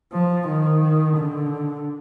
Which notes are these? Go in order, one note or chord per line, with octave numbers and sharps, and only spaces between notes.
F3
D#3
D3